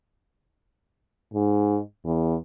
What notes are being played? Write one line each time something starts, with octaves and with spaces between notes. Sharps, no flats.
G#2
E2